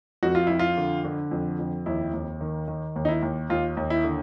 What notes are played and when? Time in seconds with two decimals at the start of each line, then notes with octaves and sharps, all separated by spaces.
0.23 F2 F#4
0.35 F4
0.47 F2 E4
0.59 F4
0.77 D3
1.04 D3
1.31 F2
1.59 F2
1.86 D#2 E4
2.13 D#2
2.41 D#3
2.68 D#3
2.96 D#2
3.05 D#4
3.08 E4
3.22 D#2
3.50 D#2 F4
3.77 D#2
3.90 E4
4.04 D3